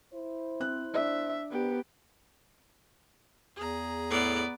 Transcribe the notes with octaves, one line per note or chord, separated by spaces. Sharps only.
E4 C5
C4 F#6
D4 D5 E5
B3 C4 G4 A#4 B4
E2 G#4 A#5
A2 B3 D5